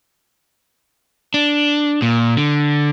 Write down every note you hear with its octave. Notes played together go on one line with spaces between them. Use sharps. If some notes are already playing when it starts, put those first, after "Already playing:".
D4
A#2
D3